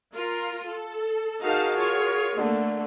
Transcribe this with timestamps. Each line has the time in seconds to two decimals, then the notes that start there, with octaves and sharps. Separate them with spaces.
0.14 F4 A#4
0.66 A4
1.43 D#4 F#4 G#4 A#4 F5 A5
1.78 F4 C#5
2.36 D3 A3 A#3